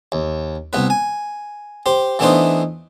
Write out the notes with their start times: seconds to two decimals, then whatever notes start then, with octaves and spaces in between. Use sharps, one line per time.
0.12 D#2
0.73 C2 B3 B4
0.90 G#5
1.86 G4 C5
2.19 E3 A3 B3 D4 D#4 C5